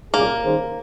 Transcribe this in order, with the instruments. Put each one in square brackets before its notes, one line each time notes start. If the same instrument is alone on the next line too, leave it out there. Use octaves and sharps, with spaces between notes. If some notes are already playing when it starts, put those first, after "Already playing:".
[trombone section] C2 A#2 G3 C#4 G#4 [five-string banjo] A#3
[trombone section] D#3 G3 C#4 G#4 C5